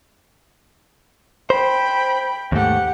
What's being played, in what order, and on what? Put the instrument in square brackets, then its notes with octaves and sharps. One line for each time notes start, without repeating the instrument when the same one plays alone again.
[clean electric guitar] C5 [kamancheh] G5 B5
[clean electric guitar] D#2 G#2 A3 [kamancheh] G4 F#5